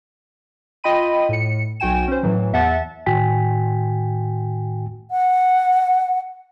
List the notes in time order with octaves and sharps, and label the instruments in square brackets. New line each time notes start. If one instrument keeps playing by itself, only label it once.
[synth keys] F4 D#5 G5 B5 D#7
A2 C#7
B1 F#4 G5 G#5 E7
C#4 C5
A2 E3 F#3
E2 E5 F#5 A5 A6
[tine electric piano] A2 D#3 F#4 G5 G#5 B6
[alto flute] F#5